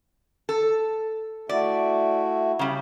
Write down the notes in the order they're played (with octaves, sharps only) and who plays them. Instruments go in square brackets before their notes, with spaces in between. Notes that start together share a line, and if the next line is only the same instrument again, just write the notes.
[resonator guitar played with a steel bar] A4
[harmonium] A3 E4 F#4 [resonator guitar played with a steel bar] D5
[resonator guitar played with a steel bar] C#3 G3